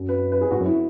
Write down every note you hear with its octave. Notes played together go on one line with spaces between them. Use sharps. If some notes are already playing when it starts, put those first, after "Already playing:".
Already playing: F#2
B4
B4
G#4
G#2 F#4
F#2
E4